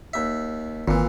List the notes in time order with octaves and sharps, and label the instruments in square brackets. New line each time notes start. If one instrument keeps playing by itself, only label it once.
[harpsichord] D#2 E5
[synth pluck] G#1 [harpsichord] A#2 E3